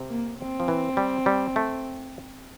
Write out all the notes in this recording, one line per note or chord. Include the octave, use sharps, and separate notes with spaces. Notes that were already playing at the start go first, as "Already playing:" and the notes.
Already playing: C3
A#3
C4
F3
E3
G3
G3
A3